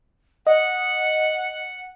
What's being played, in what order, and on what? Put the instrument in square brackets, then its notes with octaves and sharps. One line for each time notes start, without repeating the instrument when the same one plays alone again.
[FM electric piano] D#5 [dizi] F#5